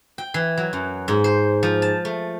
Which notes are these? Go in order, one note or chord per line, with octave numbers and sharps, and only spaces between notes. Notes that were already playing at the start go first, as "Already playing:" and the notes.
G5
E3
F#3
F#2
G#2
C5
F3
A5
A3